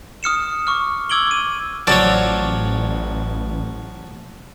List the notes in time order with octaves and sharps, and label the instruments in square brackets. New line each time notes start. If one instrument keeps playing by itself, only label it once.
[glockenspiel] D#6 F6 C#7 E7
C#6 D6 F6
D6 E6 G#6 D7 F#7 G7
D6 D#7
[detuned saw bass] A1 [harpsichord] F3 F#3 C#5 [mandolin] D5 E6